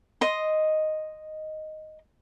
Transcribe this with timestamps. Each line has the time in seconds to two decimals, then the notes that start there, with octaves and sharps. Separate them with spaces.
0.21 D#5 C6